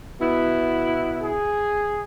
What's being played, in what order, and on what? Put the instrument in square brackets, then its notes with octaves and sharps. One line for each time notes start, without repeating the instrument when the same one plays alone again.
[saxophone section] B2 B3 E4
[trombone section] G#4